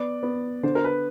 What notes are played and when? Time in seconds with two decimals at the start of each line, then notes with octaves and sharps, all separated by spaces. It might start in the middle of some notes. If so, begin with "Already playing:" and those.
Already playing: B3 D5
0.23 B3
0.63 D3 C5
0.75 A#4
0.84 B4